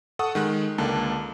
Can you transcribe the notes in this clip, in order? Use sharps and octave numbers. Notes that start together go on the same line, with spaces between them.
A4 F#5 C#6 D#6
D#3 G#3 F#6
C#2 D3 A#3 A5